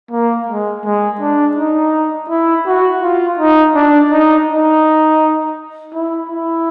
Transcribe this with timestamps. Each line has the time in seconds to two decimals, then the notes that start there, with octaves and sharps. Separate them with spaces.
0.11 A#3
0.48 G#3
0.84 G#3
1.20 D4
1.56 D#4
2.29 E4
2.66 F#4
3.02 F4
3.39 D#4
3.75 D4
4.11 D#4
4.48 D#4
5.93 E4
6.29 E4